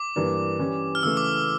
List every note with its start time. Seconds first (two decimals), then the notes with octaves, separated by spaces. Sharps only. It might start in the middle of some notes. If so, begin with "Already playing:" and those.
Already playing: D6
0.16 G2 E3 A#3 D4
0.59 E3 G3 C#4
0.95 F6
1.03 C#3 E3 A3 E6
1.17 D6